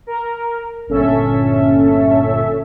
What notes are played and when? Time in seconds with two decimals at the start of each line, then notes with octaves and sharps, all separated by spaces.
0.07 A#4
0.87 G1 A#2 C#4 A4 E5